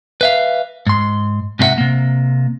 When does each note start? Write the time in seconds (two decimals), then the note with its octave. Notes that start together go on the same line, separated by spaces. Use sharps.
0.21 B4 E5 F5
0.87 G#2 C6
1.59 G#2 C3 D#4 F4 E5 F#5
1.78 C3 A#3